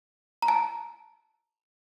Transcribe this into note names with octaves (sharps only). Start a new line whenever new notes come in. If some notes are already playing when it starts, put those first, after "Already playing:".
A#5
A5